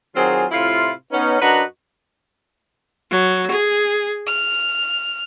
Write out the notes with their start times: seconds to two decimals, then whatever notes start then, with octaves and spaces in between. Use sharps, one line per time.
0.16 D#3 F#3 C4 F4 G#4
0.51 A2 C3 E4 F4
1.12 B3 C#4 D#4
1.41 F#2 D4 F#4 B4 D#5 A#5
3.10 F#3
3.50 G#4
4.27 F6